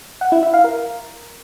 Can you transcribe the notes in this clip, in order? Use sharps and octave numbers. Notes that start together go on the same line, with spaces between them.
F#5
E4
E5
F5
A#4